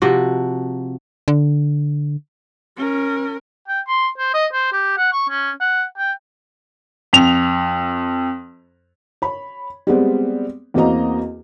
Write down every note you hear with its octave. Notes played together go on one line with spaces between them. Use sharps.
C3 F3 F#4
D3
C#4 A#4
G5
C6
C5
D#5
C5
G4
F#5
C#6
C#4
F#5
G5
F2 F7
C#5 B5
G3 G#3 B3 C4
E2 A#3 C4 F#4 D#5 A#5